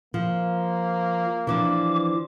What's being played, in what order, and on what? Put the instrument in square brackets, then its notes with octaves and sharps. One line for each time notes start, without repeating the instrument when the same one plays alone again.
[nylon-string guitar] F3 [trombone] A#3
[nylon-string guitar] E3 F3 D4 [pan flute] D6